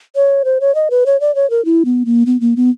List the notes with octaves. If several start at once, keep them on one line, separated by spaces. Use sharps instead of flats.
C#5
C5
C#5
D#5
B4
C#5
D5
C#5
A#4
E4
B3
A#3
B3
A#3
B3